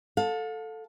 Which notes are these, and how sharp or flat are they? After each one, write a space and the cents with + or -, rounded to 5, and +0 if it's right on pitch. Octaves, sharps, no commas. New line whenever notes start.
A4 +0 F5 +40